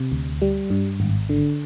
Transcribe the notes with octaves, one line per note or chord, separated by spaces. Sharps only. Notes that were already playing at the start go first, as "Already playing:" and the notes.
Already playing: C3
D2
G3
G2
G#1
D3